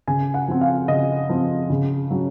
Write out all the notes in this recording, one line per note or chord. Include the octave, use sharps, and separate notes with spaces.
C#3 G#5
F#5
F3 C4
F5
C#3 D#5
F3 C4
C#3
F#3 C#4